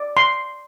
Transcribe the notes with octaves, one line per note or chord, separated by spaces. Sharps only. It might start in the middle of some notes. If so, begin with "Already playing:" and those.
Already playing: D5
C6